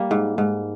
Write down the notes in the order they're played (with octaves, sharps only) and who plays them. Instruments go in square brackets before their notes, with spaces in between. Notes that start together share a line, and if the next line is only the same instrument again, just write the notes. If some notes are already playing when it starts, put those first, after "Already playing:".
Already playing: [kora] G3 A#3
G#2
G#2